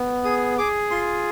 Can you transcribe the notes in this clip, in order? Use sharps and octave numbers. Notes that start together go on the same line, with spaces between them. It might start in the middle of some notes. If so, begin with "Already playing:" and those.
Already playing: B3
G#4 D#6
G#4 D6
F4 C6